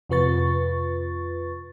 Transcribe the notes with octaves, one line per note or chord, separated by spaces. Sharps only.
F2 C3 F4 B4 C#6 A6